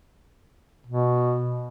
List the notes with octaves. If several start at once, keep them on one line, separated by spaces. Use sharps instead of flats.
B2